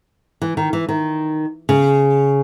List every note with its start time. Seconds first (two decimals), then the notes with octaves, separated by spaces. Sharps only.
0.42 E3
0.57 D#3
0.73 E3
0.89 D#3
1.69 C#3